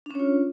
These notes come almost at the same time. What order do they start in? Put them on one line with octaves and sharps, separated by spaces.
D4 C#4 C#5 F4